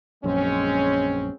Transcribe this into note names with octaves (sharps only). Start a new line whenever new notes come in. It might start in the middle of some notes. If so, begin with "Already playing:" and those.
A#1 F#2 G#3 C4 C#4